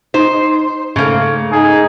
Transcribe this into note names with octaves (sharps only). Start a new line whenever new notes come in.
D#4 C5
G#2 C#3 A3 A#3 A4
D#4 G#4